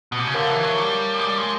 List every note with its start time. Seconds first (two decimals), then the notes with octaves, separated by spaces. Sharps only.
0.12 B2
0.19 C3
0.27 C#3
0.34 D3 G4 A#4 C#5 F5 A5
0.48 E3
0.63 F#3
0.78 G3
1.19 G#3
1.23 G3
1.38 G#3